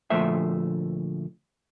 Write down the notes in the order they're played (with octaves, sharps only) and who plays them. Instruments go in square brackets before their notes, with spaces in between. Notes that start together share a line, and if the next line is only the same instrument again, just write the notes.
[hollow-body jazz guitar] D2 A#2 F3 A3 C5 E5